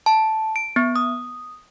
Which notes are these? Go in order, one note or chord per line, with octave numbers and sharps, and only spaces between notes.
A5
D7
B3
D#6